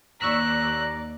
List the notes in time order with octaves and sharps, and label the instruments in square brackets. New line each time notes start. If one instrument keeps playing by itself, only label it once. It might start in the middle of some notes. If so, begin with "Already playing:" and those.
[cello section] D#2 D5 [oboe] A#5 [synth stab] C#6 E6 B6 [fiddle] F#6